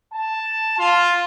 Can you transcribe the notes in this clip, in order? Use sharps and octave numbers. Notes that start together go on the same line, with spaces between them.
A5
F4